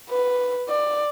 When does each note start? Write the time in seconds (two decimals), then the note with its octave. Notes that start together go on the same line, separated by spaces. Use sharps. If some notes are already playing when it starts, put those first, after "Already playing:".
0.10 B4
0.69 D5